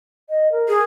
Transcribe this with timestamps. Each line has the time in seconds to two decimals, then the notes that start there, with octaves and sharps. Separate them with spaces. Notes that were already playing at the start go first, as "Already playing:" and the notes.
0.29 D#5
0.52 A#4
0.68 G#4